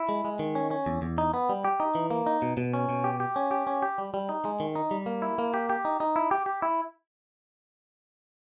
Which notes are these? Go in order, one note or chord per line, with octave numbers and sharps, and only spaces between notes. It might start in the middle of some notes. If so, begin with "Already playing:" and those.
Already playing: E4
G#3
G#3
D#3
C#4
C#4
E2
E2
D#4
B3
G3
G4
D#4
E3
A#3
D#4
B2
B2
C#4
B2
G4
G4
C#4
G4
C#4
G4
G3
G3
D#4
G#3
D#3
D#4
G3
A#3
E4
A#3
G4
G4
D#4
D#4
E4
G4
G4
E4